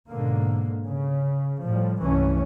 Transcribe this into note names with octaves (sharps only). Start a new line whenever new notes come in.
G#2 B2 D3 A#3
C#3
A2 F3 G3
C2 G2 E3 A3 C#4